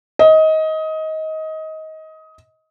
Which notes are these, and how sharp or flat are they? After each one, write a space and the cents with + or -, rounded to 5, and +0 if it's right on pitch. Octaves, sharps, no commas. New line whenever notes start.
D#5 +20